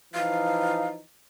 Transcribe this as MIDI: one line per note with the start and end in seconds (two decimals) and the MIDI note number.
0.14 1.00 52
0.14 1.00 53
0.14 1.00 63
0.14 0.88 77